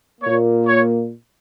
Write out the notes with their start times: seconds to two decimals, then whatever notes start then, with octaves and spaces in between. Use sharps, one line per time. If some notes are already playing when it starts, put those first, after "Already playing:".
0.21 A#2 A#3 C#5
0.67 C#5